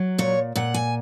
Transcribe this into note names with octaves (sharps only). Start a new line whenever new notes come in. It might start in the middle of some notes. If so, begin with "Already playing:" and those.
Already playing: F#3
A#2 C#5
A#2 F#5
G#5